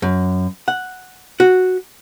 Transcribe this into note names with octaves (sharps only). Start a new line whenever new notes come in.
F#2
F#5
F#4